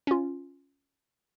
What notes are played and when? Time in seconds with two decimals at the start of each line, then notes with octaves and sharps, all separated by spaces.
0.07 C#4 F4